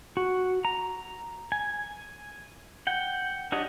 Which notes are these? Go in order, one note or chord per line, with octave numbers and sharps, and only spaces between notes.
F#4
A#5
G#5
F#5 G5
D4 F#4 G4 C#5 D#5